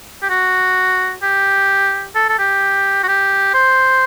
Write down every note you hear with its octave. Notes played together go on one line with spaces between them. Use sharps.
G4
F#4
G4
A4
A4
G4
F#4
G4
C5